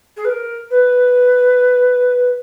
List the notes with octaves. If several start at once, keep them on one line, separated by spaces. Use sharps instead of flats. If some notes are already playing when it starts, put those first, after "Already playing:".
G#4
B4
A#4
B4